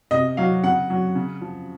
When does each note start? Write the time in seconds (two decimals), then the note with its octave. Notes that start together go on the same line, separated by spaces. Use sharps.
0.11 C3 D#5
0.37 F#3 F5
0.63 C#3 F#5
0.90 F#3
1.15 C#3
1.41 F3